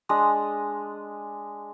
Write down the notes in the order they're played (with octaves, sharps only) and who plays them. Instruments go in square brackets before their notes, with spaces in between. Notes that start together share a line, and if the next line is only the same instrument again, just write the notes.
[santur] G#3 D4 D#5 D#6